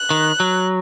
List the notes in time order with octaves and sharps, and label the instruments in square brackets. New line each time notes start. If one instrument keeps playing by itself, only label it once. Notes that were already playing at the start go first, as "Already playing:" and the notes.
Already playing: [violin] F#6
[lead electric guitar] D#3
F#3